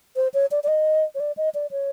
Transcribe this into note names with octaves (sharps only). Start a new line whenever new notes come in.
C5
C#5
D5
D5
D#5
C#5
D5
D#5
D5
C#5